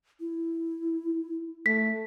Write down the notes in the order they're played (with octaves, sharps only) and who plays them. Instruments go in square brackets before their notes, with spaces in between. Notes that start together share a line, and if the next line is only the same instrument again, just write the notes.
[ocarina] E4
[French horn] A3 [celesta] B6